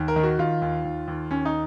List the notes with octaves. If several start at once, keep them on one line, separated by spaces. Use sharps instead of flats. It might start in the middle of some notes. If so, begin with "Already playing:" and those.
Already playing: D#2
A#4
D#3
F#4
D#3 F4
D#2
D#2
D#2
D#2 C#4
D#4